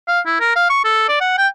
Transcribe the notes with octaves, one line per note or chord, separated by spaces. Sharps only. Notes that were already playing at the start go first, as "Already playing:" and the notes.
F5
E4
A#4
F5
C#6
A4
D5
F#5
G5